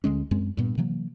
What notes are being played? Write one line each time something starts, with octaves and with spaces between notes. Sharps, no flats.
D2 D3 G#3 C#4
F#2 G#3 C4
G2 A#2 B3
C3 E3 F#3 A#3